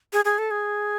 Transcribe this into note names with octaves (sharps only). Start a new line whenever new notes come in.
G#4
G#4
A4
G#4